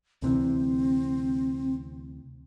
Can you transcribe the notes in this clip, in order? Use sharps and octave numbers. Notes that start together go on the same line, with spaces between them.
D2 C3 E3 C4